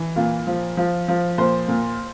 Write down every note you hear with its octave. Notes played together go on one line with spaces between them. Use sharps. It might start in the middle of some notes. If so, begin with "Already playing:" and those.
Already playing: E3
A#2 F4
F3
F3
F3
A#2 C5
A#2